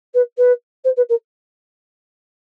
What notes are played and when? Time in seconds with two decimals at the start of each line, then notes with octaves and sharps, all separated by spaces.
0.14 B4
0.37 B4
0.84 C5
0.96 B4
1.09 A#4